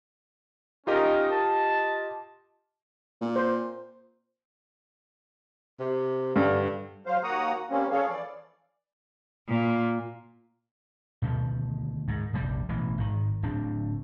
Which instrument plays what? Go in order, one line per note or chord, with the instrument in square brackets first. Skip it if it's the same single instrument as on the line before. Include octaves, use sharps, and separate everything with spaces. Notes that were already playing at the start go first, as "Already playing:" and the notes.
[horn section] C#4 D#4 A#4 [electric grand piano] F4 G4 D#5
[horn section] A5
[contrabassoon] A#2
[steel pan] C5
[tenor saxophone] C3
[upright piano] G2 [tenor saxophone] D3
[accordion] F#3 C5 F5
D#2 A#3 F#4 F#5 A#5 D#6
G3 A#3 C4 C#4
F3 C#4 G#4 A4 C#5 F5
E3 D5
[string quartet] A#2
[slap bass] D2 B2 D#3 F3
G#2 D#3
F1 A#1 A#2 G3
A1 B2 E3
G#1 D#3
D1 D2 C4 D4